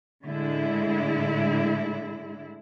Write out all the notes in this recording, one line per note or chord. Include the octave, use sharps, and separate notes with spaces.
A2 D3 G#3 E4